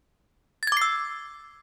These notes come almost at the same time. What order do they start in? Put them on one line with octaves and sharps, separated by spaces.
A6 G#6 D6 C7 E6